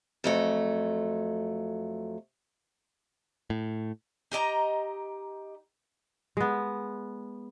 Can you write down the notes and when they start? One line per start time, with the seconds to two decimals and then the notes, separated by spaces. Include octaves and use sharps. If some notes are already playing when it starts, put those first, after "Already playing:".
0.24 F2 F#3 A3
3.50 A2
4.32 D#4 G4 D#5 A#5
6.37 G#3 B3